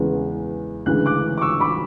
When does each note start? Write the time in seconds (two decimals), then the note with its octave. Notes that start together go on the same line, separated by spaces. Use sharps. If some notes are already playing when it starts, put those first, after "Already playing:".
Already playing: E2 C#3 E3 G#3
0.86 D2 C#3 E3 G#3 F#6
1.06 D6 F#6
1.38 D6
1.41 C#6 E6
1.60 B5 D6